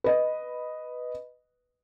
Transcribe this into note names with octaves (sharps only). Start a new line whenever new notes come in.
B4 D#5